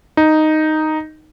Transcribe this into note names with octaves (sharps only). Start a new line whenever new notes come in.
D#4